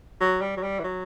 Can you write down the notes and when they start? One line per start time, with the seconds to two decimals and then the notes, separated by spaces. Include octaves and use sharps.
0.21 F#3
0.41 G3
0.57 F#3
0.63 G3
0.79 E3
0.84 F#3